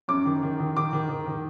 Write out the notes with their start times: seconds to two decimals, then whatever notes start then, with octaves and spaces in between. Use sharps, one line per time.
0.08 F#2 D6
0.25 D#3
0.42 D#3
0.60 D#3
0.76 D#3 D6
0.93 D#3
1.09 D#3
1.27 D#3